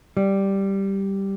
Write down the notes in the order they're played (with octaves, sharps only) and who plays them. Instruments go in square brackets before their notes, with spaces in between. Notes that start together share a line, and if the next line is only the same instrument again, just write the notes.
[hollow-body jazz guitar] G3